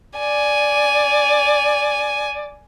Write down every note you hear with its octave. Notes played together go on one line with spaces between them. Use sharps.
D5 G#5